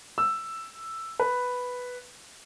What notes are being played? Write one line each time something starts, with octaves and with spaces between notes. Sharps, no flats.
E6
B4